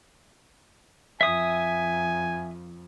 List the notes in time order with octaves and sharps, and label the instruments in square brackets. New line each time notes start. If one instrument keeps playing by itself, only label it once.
[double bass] F2 [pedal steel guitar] E5 D#6 [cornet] G#5